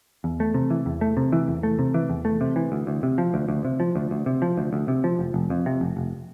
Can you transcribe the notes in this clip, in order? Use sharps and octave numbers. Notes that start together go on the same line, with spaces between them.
E2
A3
C3
E3
E2
A3
C3
E3
E2
A3
C3
E3
E2
A3
C3
E3
D2
D2
C3
F3
D2
D2
C3
F3
D2
D2
C3
F3
D2
D2
C3
F3
F1
F1
F2
C3
F1
F1